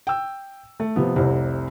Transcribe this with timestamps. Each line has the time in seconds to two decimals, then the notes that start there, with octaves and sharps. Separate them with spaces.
0.07 G5 E6
0.80 A3
0.96 C3 F3 B3
1.16 F1 C2 C3